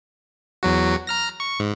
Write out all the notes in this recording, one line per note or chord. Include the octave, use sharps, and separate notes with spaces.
E2 F#3 F#4
A#5 F6 A#6
C#6
G#2